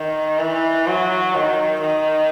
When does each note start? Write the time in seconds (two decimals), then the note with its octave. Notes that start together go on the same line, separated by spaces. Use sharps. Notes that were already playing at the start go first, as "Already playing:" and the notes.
Already playing: D#3
0.39 E3
0.87 F#3
1.34 D#3
1.82 D#3